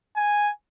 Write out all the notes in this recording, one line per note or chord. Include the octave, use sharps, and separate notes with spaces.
G#5